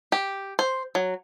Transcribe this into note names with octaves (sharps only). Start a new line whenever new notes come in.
G4
C5
F#3